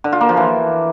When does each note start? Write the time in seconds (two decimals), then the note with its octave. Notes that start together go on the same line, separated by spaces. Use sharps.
0.04 D3
0.12 F4
0.21 A#3
0.29 F3
0.37 E3